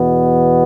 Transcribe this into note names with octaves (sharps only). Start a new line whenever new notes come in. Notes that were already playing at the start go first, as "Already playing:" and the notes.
Already playing: E2 B2 B3